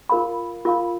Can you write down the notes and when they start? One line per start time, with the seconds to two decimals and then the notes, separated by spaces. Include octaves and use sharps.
0.09 F4 A#4 F5 B5
0.65 F4 A#4 F5 B5